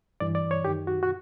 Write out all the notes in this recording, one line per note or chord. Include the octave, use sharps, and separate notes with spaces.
G2 E3 D5
D5
C#5
F#2 D#3 G4
F#4
F#4